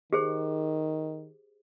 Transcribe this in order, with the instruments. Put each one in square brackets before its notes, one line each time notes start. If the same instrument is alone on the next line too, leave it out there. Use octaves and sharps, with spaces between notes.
[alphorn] D#3 [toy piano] G4 G#4 C5